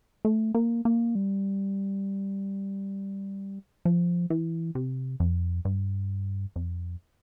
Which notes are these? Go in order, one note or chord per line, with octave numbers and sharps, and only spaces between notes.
A3
A#3
A#3
G3
F3
E3
C3
F2
G2
F2